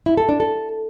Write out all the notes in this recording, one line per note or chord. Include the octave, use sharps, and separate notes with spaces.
E4
A4
D4
A4